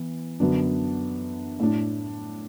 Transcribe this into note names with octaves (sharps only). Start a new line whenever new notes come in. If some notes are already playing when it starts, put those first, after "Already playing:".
Already playing: E3 B3
F#2 D3 B3 D4
A2 A3 D4